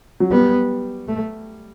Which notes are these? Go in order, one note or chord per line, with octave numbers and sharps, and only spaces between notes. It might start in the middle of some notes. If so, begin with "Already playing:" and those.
F#3
G3 B3
A3